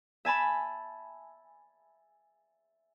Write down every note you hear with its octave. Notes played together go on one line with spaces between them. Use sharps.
E5 G#5 A5 B5